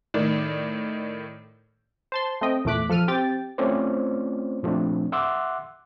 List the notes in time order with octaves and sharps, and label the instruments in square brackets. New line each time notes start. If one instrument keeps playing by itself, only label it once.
[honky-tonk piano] A2 D#3 D5
[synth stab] C5 A5 C6
A3 C4 D#5 G5
E2 A#2 A3 D6 F#6 B6
F3 A4 F6 D#7
C4 G4 G5 A6
[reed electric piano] A3 C4 C#4 F4 C5 D5
A#2 F3 A3 C4 D4
E5 F#5 C6 D6 E6 F#6